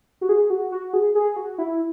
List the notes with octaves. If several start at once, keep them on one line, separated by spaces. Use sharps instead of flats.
F#4
G#4
F#4
F#4
G#4
G#4
F#4
E4